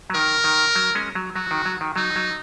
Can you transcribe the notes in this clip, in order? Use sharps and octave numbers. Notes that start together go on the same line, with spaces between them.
F#3
D#3 A#4
D#3
F#3
G#3 C#4
F#3
F#3 F#4
D#3
F#3
D#3
F#3 D#4
F#3